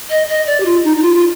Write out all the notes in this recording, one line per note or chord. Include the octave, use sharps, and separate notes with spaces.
D#5
D#5
D5
G4
F4
D#4
D#4
F4
F4